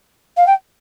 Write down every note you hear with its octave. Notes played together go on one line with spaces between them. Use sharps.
F5
G5